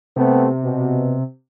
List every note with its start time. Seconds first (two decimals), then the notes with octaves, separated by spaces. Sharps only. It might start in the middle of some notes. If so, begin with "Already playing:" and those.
0.16 C3 A3 B3 C4
0.63 B2